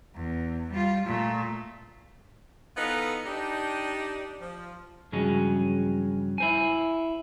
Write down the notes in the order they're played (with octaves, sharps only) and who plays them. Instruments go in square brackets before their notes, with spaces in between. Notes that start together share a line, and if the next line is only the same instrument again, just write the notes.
[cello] E2
G3 F4
A#2 A3
[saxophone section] E3 B3 D#4 F4 A4 B4
D4 D#4 G4
F3
[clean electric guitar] G2 C#3 F3 F#3 G#3 C#4
E4 C5 G#5